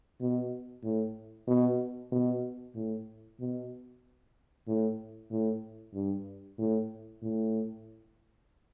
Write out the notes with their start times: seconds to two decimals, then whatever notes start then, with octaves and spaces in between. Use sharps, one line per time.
0.21 B2
0.84 A2
1.47 B2
2.12 B2
2.75 A2
3.40 B2
4.68 A2
5.30 A2
5.94 G2
6.59 A2
7.22 A2